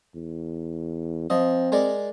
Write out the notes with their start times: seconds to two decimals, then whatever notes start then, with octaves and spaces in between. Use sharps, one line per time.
0.15 E2
1.30 F3 C4 D#5
1.72 G#3 A#4 D5